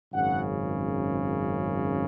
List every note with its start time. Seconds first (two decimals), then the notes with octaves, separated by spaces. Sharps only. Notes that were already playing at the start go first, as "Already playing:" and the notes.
0.13 G#1 F#2 C#3 F#5